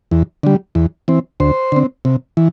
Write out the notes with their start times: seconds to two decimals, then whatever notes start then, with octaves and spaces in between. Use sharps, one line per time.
0.11 E2
0.43 D3 G3
0.75 E2
1.08 E3 C4
1.40 D2 C5
1.72 D3 C4
2.05 C3
2.37 E3